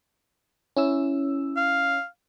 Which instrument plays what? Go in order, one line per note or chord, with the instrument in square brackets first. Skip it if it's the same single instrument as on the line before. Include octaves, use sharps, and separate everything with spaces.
[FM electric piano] C#4 E4 E6
[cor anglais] F5